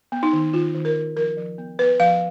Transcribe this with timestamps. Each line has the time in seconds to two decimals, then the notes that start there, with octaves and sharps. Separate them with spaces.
0.12 B3
0.23 D#4
0.33 D#3
0.53 D#3 F4
0.74 D#3
0.85 A#4
0.96 D#3
1.16 F3 A#4
1.37 F3
1.58 B3
1.79 B3 B4
1.99 F3 F5